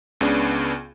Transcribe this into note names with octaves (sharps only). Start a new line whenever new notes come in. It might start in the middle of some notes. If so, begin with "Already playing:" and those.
C#2 C#3 B3 D4